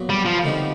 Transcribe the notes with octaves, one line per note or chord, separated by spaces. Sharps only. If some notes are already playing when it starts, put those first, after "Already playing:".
Already playing: A#2 F#3 B3
G3
F3
D2 C3 D#3 G3 B3